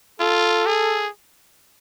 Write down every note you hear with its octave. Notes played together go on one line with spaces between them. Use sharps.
F4 A4
G#4